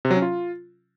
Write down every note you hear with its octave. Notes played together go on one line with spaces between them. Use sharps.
C3
F#3
C#4
F4